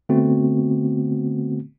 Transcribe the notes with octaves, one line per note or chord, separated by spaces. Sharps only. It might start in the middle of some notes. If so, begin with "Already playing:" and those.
D3 A3 B3 C4 F#4